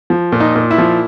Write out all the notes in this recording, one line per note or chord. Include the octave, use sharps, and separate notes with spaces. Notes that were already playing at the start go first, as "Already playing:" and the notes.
F3
A#2
D#4
A#2
E4
F3